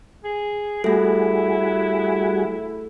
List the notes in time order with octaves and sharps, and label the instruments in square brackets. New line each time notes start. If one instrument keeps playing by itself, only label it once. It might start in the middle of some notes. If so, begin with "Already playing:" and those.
[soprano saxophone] G#4
[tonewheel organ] G3 F#4 G#4 [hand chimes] A3 A4 [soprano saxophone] E4